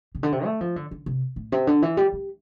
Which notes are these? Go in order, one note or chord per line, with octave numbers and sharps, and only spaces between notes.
C3
D3
C3
A3
F3
D3
D3
C3
A2
C3
D3
E3
G3
G3